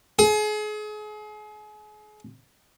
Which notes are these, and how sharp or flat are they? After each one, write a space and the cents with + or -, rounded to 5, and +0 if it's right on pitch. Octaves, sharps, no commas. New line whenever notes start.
G#4 +35